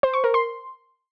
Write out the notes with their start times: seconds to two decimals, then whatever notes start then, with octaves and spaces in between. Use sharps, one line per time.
0.03 C5
0.14 C#6
0.24 A#4
0.34 C6